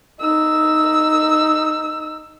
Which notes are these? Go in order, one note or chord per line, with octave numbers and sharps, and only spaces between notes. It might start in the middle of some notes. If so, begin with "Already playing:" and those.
D#4 E6